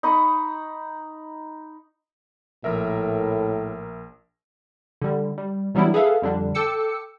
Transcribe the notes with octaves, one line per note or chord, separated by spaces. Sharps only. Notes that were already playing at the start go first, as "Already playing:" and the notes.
D#4 B5 C#6 D#6
A#1 A2 A#4 E5
D3 G3
G3
E3 F#3 G3 B3 D4 E4
G#4 A4 B4 E5 F5
F2 D3 G3 D4
A4 G5 D6 E6 C#7